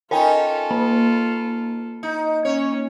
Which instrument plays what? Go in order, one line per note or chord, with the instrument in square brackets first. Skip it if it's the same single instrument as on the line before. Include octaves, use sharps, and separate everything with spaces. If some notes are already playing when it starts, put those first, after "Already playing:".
[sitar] C#4 D#4 [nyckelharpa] F4 A4 [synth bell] A#4 G5 G#5
[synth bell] A#3
[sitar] D#4
[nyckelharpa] C#4 [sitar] C#5